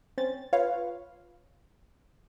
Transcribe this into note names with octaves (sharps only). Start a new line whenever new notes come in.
C4 C#4 A6
F4 B4 C#5 F5